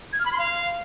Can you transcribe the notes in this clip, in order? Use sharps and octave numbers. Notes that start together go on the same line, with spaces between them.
G#6
F6
B5
C6
F5